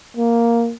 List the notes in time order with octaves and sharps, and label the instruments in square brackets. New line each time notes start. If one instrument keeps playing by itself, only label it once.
[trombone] A#3